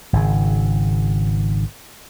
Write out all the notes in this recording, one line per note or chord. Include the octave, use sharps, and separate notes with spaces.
G#1 C#3